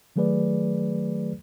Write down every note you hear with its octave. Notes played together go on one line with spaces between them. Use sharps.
D#3 F#3 A3 G#4 B4 D5